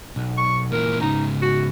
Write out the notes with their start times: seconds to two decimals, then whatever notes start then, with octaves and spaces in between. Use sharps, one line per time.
0.16 B1
0.38 C#6
0.72 A#2 E3 A#4
1.01 G#2 C#3 D#4
1.42 F#4